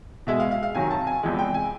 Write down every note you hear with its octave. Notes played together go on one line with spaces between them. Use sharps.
B2 G#3 E5
F5
F5
F5
C3 D#3 F#3 G#5
A5
G#5
E2 C3 F3 G#3
G5
G#5